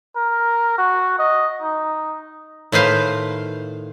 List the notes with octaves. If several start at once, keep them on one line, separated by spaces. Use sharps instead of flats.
A#4
F#4
D#5
D#4
A2 D#3 B4 C5 F5